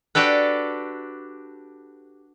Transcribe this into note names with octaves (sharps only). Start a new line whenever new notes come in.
D4 F#4 G4 A4 B4